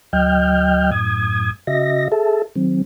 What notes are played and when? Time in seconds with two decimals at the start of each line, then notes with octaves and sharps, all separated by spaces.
0.13 D2 F#3 D#5 G5 F6 G6
0.91 F#2 A2 D#6 G#6
1.67 C#3 F#4 D#5 E5 A#6
2.12 G#4 A4 E5 A5
2.56 D#3 F#3 C4